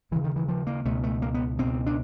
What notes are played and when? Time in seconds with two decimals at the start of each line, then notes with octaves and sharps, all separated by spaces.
0.11 D#2 C#3 E3
0.24 D#3
0.36 E3
0.48 F3
0.67 A#3
0.85 C#2 B2 A3
1.04 A3
1.22 A#3
1.34 B3
1.58 C#2 B2 C4
1.86 D4